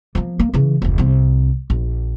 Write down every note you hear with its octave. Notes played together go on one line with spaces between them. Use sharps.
F3 A#3
A#3
C#3 E3
F1 D2
C2 C4
A#1